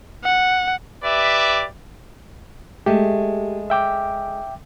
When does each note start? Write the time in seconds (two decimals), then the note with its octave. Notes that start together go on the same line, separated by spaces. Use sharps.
0.24 F#5
1.03 G4 B4 D5 E5
2.86 G#3 A3 G4
3.70 E5 G5 D6